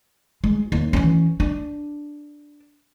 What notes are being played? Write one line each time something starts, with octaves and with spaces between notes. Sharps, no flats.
G#3
D#2
E3 C#4
D4